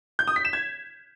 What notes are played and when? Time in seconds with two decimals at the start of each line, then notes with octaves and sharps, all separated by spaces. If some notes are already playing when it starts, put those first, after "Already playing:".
0.19 G6
0.28 D#6
0.36 B6
0.45 E7
0.53 G#6